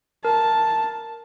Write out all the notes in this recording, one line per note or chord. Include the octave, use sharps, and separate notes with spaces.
A#4 A5